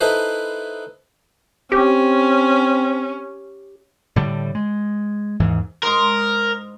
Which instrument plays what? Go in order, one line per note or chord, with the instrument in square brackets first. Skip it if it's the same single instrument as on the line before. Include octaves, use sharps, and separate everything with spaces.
[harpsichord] D#4 E4 A4 B4 C5
[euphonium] C4 [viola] C#4 [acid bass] G4
[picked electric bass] A2 D3 G3
G#3
D#2 G#2 E3
[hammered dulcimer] G#2 D#5 C6 [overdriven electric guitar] A#4